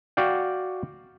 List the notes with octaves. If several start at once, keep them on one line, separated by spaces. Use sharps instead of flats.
F#4 D5 F5 G5